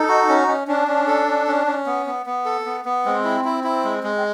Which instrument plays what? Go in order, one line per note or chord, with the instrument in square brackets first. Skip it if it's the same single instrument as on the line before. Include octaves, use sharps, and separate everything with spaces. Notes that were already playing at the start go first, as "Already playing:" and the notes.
Already playing: [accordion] D#4 [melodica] A4
[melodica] F#4
C#4
C#4
[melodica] C#4 [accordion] D4
[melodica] C#4
A4
C#4
C#4
C#4
B3
B3
B3
A4
B3
B3
[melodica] G#3 [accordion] C4
[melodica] E4
E4
E4
G#3
G#3
[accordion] C4